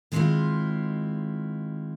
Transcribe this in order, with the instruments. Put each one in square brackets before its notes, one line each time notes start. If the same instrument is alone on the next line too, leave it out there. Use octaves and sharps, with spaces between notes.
[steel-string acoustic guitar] D#3 G#3 C4 C#4 E4 F4